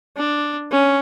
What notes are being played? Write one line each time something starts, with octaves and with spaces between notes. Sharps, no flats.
D4
C#4